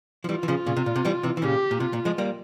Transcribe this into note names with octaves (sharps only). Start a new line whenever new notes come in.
F3
E3 G3 F4
E3
C#3 F3
A#2 C#3
C3
A#2
C3
E3 G3
C3 E3
E3
A#2 C#3 G4
A#2
C3 F4
A#2
F3 G#3
G3 A#3